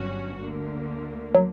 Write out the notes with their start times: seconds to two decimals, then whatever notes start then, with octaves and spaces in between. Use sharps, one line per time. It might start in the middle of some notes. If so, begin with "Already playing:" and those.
Already playing: G1 G2 F#3 C#4 F#4
0.39 D2 D3 A#3
1.35 F#3